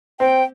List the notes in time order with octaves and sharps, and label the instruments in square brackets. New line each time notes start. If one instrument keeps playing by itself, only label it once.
[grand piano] C4 [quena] G5